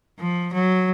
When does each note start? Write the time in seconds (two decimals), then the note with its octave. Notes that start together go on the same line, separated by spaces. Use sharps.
0.20 F3
0.53 F#3